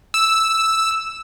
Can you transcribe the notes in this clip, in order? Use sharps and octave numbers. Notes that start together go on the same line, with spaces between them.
E6